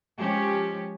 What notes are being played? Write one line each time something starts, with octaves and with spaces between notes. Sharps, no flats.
F3 G#3 C#4 G4